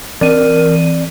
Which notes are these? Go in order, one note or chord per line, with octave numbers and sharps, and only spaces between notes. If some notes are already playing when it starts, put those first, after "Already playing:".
E3 C4 A#4 D5 D#7